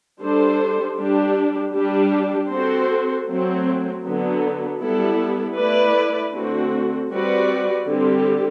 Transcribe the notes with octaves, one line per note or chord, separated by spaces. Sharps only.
G3 D4 A4 C5
G3 D4 G4
G3 D4 G4
C4 F#4 A4 C5
F#3 A3 C4
D3 F#3 B3
G3 B3 E4 A4
A3 E4 B4 D5
D3 A3 C4 F#4
G3 C4 F#4 B4 D5
D3 G3 C4 G4